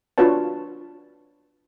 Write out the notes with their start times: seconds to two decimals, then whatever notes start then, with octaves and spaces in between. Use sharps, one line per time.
0.18 D4 F4 F#4 B4 C#5 A5